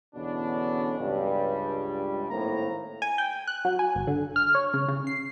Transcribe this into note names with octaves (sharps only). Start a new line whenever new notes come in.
E2 B2 D3 C#4 D4
C#2 G2 G3
G#1 A2 A#3 C5 A#5
G#5
G5
F#6
F#3
G#5
G1
D3
F6
C#5
C#3
C#3
C7